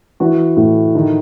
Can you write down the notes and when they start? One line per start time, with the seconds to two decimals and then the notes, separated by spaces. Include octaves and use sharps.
0.20 E3 F#4
0.57 A2
0.95 D#3